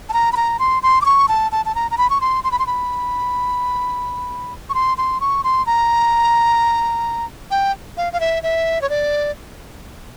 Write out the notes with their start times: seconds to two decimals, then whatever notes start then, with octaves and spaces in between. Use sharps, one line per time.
0.09 A5
0.13 A#5
0.33 B5
0.37 A#5
0.59 C6
0.83 C6
1.02 D6
1.05 C#6
1.28 A5
1.52 A5
1.66 A5
1.75 A#5
1.91 A#5
1.98 B5
2.10 C#6
2.21 C6
2.44 C6
2.52 B5
2.59 C6
2.67 B5
4.70 C#6
4.75 C6
4.98 C6
5.21 C#6
5.44 C6
5.66 A#5
7.51 G5
7.97 F5
8.13 F5
8.20 E5
8.43 E5
8.82 C#5
8.90 D5